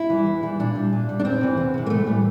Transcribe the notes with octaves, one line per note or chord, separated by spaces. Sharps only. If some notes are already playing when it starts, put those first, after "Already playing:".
Already playing: E4
E3 G3
E2
E3 G3
A#2 D4
G3
A#2
G3
D4
E2 C4
C3 E3
E2
C3 E3
A#3
A2 A3
E3 G3